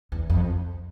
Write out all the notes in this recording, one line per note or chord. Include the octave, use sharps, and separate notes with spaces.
E2
F2